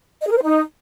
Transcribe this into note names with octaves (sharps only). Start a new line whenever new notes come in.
D#5
G#4
A#4
C5
D#4